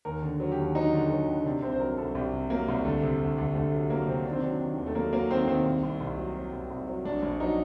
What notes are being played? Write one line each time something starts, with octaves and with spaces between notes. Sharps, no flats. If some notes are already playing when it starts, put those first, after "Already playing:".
D#2 A#4
D3
F#3
G4
D#2
F#3 D#4
D3
F#3
D3
C3 D4
C2 C4
C5
F#3 A#4
C2 A4
C2 G4
C3
F#3 A#3
C2
D2 A3
C3
D2
D2
D2 A3
F#3
F#3 A#3
C3 C4
D#3 D4
C4
F#3 D4
D#3
D#2
A3
F#3 A#3
F#3 A#3
D#3 C4
D#3 C4
C2
C2
C2
F#3
F#3
C2
C2
F#3
A#1 D4
A#1
F#3 D#4